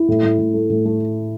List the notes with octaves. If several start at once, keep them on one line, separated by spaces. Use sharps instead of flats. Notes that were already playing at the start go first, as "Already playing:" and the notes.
Already playing: E4
A2
A2
A2
A3
A2
A3